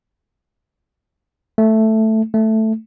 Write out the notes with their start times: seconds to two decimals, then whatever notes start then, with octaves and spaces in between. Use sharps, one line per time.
1.58 A3
2.34 A3